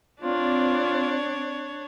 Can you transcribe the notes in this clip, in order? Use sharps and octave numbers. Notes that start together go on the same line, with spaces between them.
C4 D4 F4 C#5 D5